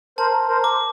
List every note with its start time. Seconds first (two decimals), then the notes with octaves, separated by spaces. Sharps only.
0.18 A#4 C5 A5
0.48 A#4 C5
0.64 D6